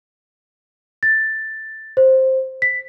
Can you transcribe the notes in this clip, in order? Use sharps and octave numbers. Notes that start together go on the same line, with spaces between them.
A6
C5
B6